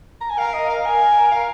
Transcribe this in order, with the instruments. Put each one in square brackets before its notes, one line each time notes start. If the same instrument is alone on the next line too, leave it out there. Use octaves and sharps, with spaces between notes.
[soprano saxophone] A#5
G#5
[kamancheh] A#4 [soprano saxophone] F5
[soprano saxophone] D#5
F5
[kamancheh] A#4 [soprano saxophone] G#5
[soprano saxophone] F5